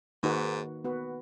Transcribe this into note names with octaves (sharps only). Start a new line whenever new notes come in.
G#2 D#3 A#3 D#4 F#4 B4
B3 F#4 B4